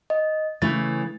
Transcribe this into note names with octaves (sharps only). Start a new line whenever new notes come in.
D#5
C#3 E3 A3 A6